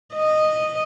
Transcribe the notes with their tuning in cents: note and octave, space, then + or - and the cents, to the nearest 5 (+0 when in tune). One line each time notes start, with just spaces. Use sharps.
D#5 -10